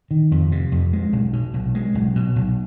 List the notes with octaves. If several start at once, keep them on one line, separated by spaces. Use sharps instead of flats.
D#3
F2
C3
F2
G#3
B1
B2
B1
G#3
B1
B2
B1